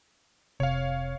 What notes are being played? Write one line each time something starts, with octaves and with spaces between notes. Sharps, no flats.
F1 C3 C#5 F5